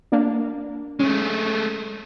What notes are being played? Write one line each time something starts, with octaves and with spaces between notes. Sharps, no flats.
A#3 D4
G#3 A3 C#4